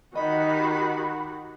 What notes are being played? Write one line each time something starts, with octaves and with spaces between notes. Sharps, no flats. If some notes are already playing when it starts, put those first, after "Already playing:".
D#3 F#4 G4 D#5 F#5 B5